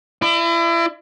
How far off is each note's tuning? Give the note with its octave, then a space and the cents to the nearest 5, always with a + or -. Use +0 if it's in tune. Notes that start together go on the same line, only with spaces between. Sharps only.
E4 +35 D#5 -45